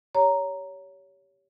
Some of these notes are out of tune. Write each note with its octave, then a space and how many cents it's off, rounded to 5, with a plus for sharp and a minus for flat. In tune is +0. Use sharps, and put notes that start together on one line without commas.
G4 +0 C#5 +20 A#5 +0